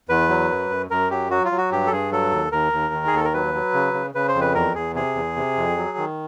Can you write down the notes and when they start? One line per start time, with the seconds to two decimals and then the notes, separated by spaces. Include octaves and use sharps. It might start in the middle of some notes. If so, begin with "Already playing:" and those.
0.09 E2 B4
0.29 F#3
0.50 F#2
0.70 F#2
0.90 F#2 A#4
1.10 F#3 G4
1.31 F#3 F#4
1.45 F4
1.52 F#3
1.58 F#4
1.72 G2 G4
1.87 A4
1.91 G2 G#4
2.12 F#3 A4
2.32 D#2
2.52 D#2 A#4
2.73 D#2
2.94 D#3
3.07 G#4
3.13 D#2 A4
3.24 A#4
3.33 F#3 B4
3.54 F#3
3.74 C#3
3.94 C#3
4.15 C#3 B4
4.28 C5
4.35 F2
4.41 B4
4.54 E2 A#4
4.75 E2 G#4
4.95 C3 G#4
5.15 E2
5.36 C3
5.57 F2
5.77 F#3
5.97 D#3